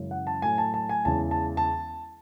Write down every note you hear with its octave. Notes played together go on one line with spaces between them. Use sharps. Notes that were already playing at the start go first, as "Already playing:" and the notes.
Already playing: F#2 C#3 E3 G#3
F#5
A5
A2 F#3 G#5
A5
A5
G#5
E2 C#3 E3 G#3 A5
A5
A5